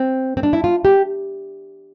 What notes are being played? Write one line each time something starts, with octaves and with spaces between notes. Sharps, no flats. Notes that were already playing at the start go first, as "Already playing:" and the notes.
Already playing: C4
C4
D4
E4
F4
G4